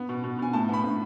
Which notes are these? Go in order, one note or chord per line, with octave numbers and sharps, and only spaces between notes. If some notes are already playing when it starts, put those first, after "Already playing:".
Already playing: B3
B2
B2
B2 G#5
A2 A5
B3 B5
A2